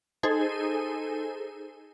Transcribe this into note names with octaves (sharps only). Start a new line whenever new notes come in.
D#4 G#4 A4 C5 G#5